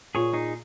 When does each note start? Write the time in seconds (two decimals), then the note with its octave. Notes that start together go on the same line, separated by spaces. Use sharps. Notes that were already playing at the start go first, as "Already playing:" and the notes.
0.15 A#2 G#4 C#5
0.33 D#4 G#4